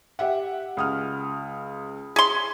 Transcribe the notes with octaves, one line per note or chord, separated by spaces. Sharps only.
G4 E5 F#5
C#2 D#6 F6
G#4 C6 B6